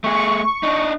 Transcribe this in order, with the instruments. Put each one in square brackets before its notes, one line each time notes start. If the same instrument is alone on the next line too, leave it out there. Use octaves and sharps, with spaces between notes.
[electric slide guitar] A3 G4 G#4 [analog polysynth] C#6
[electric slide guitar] D4 D#4